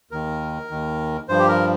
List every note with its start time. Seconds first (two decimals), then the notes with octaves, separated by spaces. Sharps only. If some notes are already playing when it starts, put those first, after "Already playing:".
0.11 D#2 D#3 A#4
0.70 D#2 D#3
1.29 G2 F3 C5
1.39 G4
1.48 A#4